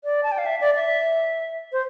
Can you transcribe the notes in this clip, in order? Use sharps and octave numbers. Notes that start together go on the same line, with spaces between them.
D5
A5
G5
F5
E5
D5
E5
C5